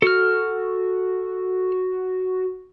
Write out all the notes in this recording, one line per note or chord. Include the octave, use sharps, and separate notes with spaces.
F#4 A4 F6